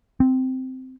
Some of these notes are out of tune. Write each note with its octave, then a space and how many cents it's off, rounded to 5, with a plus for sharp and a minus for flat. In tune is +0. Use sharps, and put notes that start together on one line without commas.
C4 -10